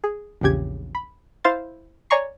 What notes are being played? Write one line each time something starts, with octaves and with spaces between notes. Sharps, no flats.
G#4
A#1 E2 C#3 G4 G#6
B5
E4 C5 F5 C6 A6
C#5 D5 G#5 A#5 C#6 C7